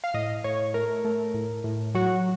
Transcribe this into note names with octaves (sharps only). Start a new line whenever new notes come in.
F5
A2 D#5
A2 C#5
A3 A#4
A3
A2
A2
F#3 F#4